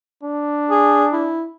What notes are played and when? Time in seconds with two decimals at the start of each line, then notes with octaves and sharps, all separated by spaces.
0.24 D4
0.70 G#4
1.13 E4